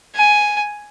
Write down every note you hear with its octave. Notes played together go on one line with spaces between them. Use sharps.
G#5